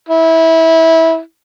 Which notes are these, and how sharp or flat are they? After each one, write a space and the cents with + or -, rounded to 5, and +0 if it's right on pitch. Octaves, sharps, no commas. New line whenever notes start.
E4 -20